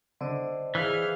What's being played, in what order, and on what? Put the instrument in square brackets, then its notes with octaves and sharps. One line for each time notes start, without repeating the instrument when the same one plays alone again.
[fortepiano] D3 [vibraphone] C5 D5 D#5
[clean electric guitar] E3 [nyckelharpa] G#4 F5 [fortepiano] F6